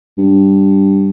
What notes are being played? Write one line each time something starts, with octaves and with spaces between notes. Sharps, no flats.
G2